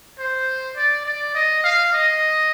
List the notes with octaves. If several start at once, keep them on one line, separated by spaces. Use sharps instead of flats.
C5
D5
D5
D#5
F5
D#5